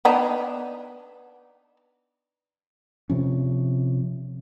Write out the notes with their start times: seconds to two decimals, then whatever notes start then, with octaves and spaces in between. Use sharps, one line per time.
0.05 B3 D4 D#4
3.10 C3 F3 C#4